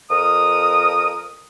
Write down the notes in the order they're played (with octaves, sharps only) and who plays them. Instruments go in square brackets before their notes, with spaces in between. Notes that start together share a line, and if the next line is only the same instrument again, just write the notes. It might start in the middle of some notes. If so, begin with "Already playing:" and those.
[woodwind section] F2 A#4 D#6